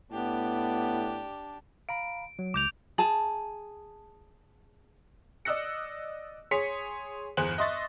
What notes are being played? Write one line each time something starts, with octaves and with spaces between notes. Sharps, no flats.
A2 B3 D4 G4
F5 A#5 B5 D7
F#3
C#2 D6 G6 F7
G#4 A5
D5 D#5 E6 F#6 A#6 C#7
G#4 C#5 C6 B6 C#7
G1 E2 G#4 C5 F#6 F#7
D#5 E5 C6 C#6 A6 A#6